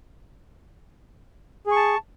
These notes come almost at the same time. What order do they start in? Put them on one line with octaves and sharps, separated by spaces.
G#4 C#6 A5